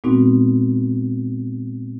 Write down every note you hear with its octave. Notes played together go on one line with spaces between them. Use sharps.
A#2 G#3 B3 C4 D#4 F#4